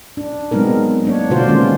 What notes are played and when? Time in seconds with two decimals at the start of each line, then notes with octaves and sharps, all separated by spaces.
0.17 D4
0.51 F#3 G#3 B3 C4 D#4 A#4
1.05 A#3 D4 C#5
1.30 B2 D3 F4 F#4 C5 D5
1.46 D#3 G#3 A#3 B3 C#4 F4